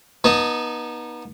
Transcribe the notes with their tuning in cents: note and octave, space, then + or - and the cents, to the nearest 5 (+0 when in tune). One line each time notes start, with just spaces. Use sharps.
B3 -30 D#4 +0 A5 +20